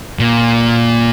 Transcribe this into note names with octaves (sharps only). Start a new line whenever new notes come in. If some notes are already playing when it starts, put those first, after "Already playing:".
A#2